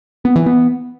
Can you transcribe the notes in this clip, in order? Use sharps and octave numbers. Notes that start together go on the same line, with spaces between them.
B3
E3
B3